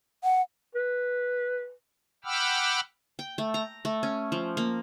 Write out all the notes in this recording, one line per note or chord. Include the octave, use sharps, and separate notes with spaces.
F#5
B4
F#5 G5 B5 D6 E6 F6
G5
A3
A#5
A3
C#4
F3
A#3